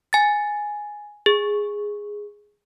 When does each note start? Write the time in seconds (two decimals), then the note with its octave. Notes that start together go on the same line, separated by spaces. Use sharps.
0.13 G#5 A6
1.26 G#4